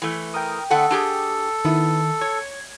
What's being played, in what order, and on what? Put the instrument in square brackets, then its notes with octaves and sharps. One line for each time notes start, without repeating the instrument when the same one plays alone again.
[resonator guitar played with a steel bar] E3 A3
[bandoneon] A#4 [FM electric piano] G5 D#6
[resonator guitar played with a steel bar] D3 A3 F#5 [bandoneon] A4
[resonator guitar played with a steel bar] D4 G4 G#4
[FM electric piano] D#3 E4 [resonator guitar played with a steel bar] B3
[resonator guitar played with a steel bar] C#5 [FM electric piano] G#6